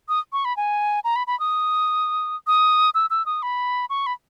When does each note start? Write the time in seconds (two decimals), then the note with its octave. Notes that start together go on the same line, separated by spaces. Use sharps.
0.09 D#6
0.33 C#6
0.45 B5
0.57 G#5
1.04 A#5
1.16 B5
1.27 B5
1.40 D#6
2.47 D#6
2.95 E6
3.10 E6
3.26 D#6
3.43 B5
3.90 C#6
4.06 B5